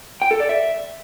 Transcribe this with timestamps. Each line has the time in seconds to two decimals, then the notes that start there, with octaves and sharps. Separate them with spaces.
0.22 G5
0.31 A4
0.40 D5
0.49 E5